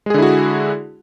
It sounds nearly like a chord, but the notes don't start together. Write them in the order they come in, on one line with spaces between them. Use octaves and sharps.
G#3 G#4 D3 E4 F#4